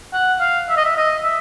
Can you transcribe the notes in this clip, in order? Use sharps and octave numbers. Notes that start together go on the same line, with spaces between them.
F#5
F5
E5
D#5
E5
D#5
E5